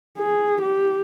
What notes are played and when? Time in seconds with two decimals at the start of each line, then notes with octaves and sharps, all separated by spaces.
0.18 G#4
0.62 G4